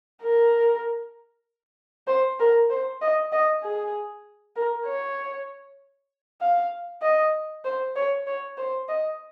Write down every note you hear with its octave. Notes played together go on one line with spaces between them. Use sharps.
A#4
C5
A#4
C5
D#5
D#5
G#4
A#4
C#5
F5
D#5
C5
C#5
C#5
C5
D#5